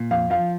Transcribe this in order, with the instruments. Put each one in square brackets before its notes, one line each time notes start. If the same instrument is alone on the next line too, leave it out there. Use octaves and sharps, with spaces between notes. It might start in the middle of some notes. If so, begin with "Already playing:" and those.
Already playing: [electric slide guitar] A#2
[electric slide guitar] F2 [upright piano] F5
[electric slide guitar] F3 [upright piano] F5